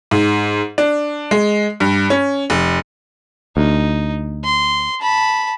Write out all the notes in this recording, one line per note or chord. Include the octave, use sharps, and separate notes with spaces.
G#2
D4
G#3
G2
C#4
F1
D2 D#4
C6
A5 B5